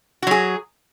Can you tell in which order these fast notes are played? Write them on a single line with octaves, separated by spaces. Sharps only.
F#4 F#3 G#4